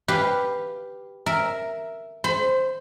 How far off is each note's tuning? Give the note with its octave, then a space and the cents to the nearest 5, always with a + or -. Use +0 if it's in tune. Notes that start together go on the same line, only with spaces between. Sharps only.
G4 +0 B4 +0 F5 -5
A#4 +0 E5 +0
C5 +0 B5 +35